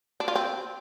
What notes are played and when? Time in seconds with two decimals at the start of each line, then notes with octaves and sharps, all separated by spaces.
0.20 D4
0.28 F4
0.35 C4